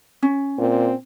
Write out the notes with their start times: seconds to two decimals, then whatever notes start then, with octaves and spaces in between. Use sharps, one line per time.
0.22 C#4
0.59 A#2 C4